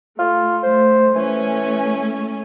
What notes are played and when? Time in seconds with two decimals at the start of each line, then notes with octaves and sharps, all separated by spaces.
0.19 A3 F4
0.63 A3 C5
1.16 E3 A3 C#4 G#5